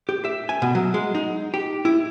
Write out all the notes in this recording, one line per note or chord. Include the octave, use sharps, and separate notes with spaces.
G4
E5
G#5
B2
F#3
G#3
D#4
G4
E4